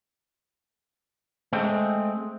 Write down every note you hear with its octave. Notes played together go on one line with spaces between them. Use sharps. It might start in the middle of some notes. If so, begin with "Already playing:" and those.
G#3 A3 C4